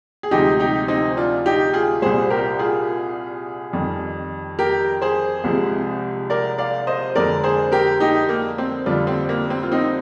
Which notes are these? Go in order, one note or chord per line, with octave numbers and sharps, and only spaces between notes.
G#4
D2 C3 F3 G#3 D#4 G4
D#4 G4
C4 D#4
D4 F4
D#4 G4
F4 G#4
C2 A#2 G3 G#4 C5
G4 A#4
F4 G#4
F2 D#3 G3
G4 A#4
G#4 C5
C2 C3 F3 G#3
A#4 D5
D5 F5
C5 D#5
F2 D3 G#3 A#4 D5
G#4 C5
G4 A#4
D#4 G4
A#3
C4
F2 D3 G3 D4 F4
C4
A#3
C4
F4
C4 D#4